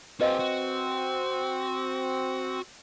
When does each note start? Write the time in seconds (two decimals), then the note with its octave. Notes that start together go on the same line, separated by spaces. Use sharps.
0.21 C4 F#4 G#4 B4 D#5 F5
0.39 F#4